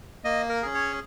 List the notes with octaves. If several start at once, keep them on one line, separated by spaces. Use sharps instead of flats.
A#3 D#5
A#4
C#4 G#4
C#5